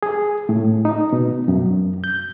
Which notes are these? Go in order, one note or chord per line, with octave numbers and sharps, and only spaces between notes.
G#4
A2
D#4
B2
F#2
G6